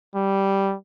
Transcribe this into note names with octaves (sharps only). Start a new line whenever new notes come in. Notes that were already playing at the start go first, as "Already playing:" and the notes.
G3